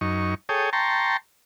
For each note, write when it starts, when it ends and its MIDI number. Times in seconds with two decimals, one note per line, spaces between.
0.01 0.35 42
0.01 0.35 63
0.01 0.35 85
0.49 0.70 68
0.49 0.70 69
0.49 0.70 73
0.49 0.70 79
0.49 0.70 87
0.73 1.17 79
0.73 1.17 81
0.73 1.17 82
0.73 1.17 84
0.73 1.17 85